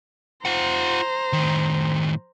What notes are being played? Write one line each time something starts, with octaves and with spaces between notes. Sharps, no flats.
F4 C5 F#5 A#5
A2 D#3